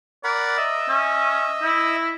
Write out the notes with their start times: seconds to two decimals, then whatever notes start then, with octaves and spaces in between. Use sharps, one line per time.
0.24 A#4 D5 F#5 B5
0.57 D#5 E5
0.89 C#4
1.62 E4